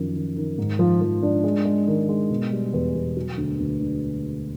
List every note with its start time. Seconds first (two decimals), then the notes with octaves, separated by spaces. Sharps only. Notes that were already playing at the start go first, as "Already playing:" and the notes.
Already playing: F#2 D#3 F3
0.15 D#3
0.36 D#3
0.58 G#2
0.79 F3
1.02 F3
1.23 D4
1.44 G#3
1.65 G#3
1.87 D#3
2.08 G#3
2.30 B2
2.52 G3
2.73 E2
2.95 B2
3.17 F#3
3.37 D2
3.59 D2
3.81 D3